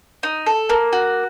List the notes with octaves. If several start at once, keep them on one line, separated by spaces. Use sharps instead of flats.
D#4
A4
A#3
F#4